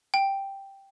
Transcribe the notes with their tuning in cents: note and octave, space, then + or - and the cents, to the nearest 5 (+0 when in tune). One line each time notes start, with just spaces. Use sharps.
G5 +0